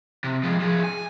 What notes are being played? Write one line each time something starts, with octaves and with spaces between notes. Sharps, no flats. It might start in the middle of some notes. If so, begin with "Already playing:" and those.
C3
F3 G#3
F3 G#4
G#5